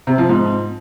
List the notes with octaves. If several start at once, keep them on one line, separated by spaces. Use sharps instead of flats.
C3
F3
G#2